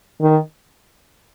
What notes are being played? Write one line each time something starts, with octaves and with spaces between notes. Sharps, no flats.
D#3